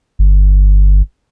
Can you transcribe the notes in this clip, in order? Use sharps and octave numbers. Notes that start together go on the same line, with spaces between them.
G1